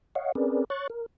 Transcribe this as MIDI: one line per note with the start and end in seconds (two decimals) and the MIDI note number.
0.15 0.32 73
0.15 0.32 75
0.15 0.32 77
0.15 0.32 78
0.35 0.65 60
0.35 0.65 61
0.35 0.65 68
0.35 0.65 70
0.35 0.65 71
0.35 0.65 74
0.70 0.88 73
0.70 0.88 85
0.70 0.88 90
0.70 0.88 93
0.90 1.06 70